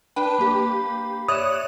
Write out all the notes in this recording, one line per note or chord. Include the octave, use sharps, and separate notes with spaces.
D4 B4 G5 B5
A#3 G4
C#5 D5 E5 D#6 F#6 E7